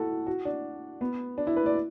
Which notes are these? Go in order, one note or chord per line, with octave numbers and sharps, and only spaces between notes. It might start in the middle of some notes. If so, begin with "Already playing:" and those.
Already playing: E4 F#4 A4
F#4
D4
B3
D4
E4
B4
D5